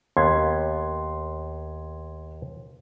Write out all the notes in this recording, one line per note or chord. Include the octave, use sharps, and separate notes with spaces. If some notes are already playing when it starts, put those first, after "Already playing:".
D#2 B3 C6 G#6